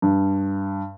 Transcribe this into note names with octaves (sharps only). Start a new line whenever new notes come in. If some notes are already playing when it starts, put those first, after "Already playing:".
G2